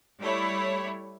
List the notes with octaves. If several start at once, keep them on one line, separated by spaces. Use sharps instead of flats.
G3 A3 E4 C#5